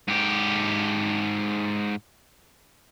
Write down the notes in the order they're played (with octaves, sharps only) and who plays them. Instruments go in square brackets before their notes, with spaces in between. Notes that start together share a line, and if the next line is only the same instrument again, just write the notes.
[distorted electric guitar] G#2 G4